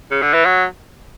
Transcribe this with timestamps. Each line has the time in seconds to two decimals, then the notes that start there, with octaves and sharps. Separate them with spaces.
0.11 C#3
0.22 D3
0.34 E3
0.45 F#3